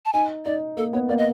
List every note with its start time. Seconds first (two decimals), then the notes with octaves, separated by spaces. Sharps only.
0.05 A5
0.13 D#4 G#5
0.45 D#4 D5
0.77 A#3 A4
0.93 B3 C#5
1.09 A#3 D5
1.18 D#5